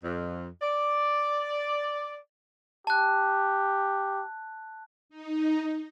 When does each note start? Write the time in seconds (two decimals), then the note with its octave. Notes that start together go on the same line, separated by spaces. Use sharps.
0.04 F2
0.61 D5
2.87 G4 A5 F#6
5.09 D#4